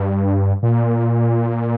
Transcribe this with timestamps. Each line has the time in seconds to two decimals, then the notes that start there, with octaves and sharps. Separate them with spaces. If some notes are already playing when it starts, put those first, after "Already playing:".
Already playing: G2
0.63 A#2